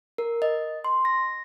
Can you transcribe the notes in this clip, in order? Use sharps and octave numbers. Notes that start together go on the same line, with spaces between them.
A#4
D#5
C6
A#6